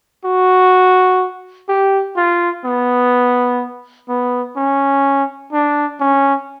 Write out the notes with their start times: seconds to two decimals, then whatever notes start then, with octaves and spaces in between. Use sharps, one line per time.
0.25 F#4
1.69 G4
2.17 F4
2.65 B3
4.09 B3
4.56 C#4
5.52 D4
6.00 C#4